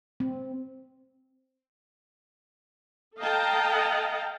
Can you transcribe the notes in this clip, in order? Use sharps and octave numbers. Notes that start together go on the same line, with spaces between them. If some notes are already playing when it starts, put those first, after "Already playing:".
C4
A4 D#5 F5 G5 A5 A#5